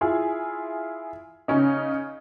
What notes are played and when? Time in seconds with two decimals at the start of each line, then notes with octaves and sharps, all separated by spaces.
0.01 E4 F4 G#4
1.48 C#3 C#4 D#4